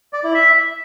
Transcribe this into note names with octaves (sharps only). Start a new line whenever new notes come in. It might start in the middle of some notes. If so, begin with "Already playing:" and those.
D5
E4
E5